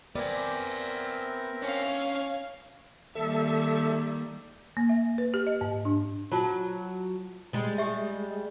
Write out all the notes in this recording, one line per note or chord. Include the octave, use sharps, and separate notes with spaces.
B3 C4 A#4 D5 E5 G#5
C#4 D4 C#5 F5
D#3 G3 A#3 A4 E5
A#3
E5
B4
G4
D#5
G#2
D4
F#3 F4 A5
G3 G#3
G4 E5